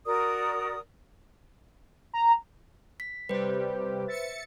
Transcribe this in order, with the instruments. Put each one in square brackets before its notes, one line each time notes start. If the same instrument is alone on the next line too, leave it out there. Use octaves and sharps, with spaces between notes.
[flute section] F#4 A#4 D5 D#6
[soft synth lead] A#5
[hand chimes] B6
[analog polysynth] C3 G3 G4 [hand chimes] B4 C5
[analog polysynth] E5 A6 C#7